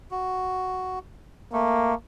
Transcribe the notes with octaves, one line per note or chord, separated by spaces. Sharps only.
F#4
A3 A#3